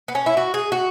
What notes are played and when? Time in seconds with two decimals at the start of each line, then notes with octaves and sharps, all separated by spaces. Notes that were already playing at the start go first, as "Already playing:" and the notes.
0.08 B3
0.15 C#4
0.26 E4
0.37 F#4
0.54 G#4
0.72 F#4